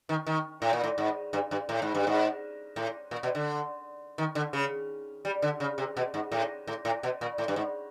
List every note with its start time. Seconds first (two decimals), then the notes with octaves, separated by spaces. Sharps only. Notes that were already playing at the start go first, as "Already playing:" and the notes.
0.09 D#3
0.27 D#3
0.62 A2
0.73 A#2
0.84 A2
0.98 G#2
1.33 G2
1.51 G2
1.69 A2
1.82 G#2
1.95 G2
2.07 G#2
2.76 A2
3.11 A#2
3.23 B2
3.35 D3
4.18 D#3
4.35 D3
4.53 C#3
5.25 G3
5.42 D3
5.60 C#3
5.78 C3
5.97 B2
6.14 G#2
6.32 A2
6.67 A2
6.85 A2
7.03 B2
7.21 A#2
7.38 A2
7.48 G2
7.56 G#2